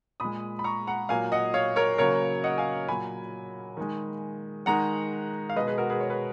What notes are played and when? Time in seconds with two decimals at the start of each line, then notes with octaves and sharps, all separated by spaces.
0.20 A#2 G#3 B5 D#6
0.59 B5
0.64 A#5 C#6
0.87 F#5 A#5
1.09 A#2 F#3 A#3 F5 G#5
1.32 D#5 F#5
1.54 C#5 F5
1.76 A#4 C#5
1.98 C#3 F#3 A#3 A#4 C#5
2.44 D#5 F#5
2.58 F5 G#5
2.88 A#2 F#3 A#3 G#5 B5
3.77 D#3 G#3
4.66 D#3 G#3 F#5 A#5
5.50 F5
5.56 B2 G#3 B4 D#5
5.67 G#4 B4
5.78 F#4 A#4
5.90 G#4 B4
6.00 C#5
6.10 B4